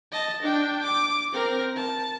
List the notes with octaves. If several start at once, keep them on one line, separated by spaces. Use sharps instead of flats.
D#5 A5
D4 G5
D6
C4 A#4
A5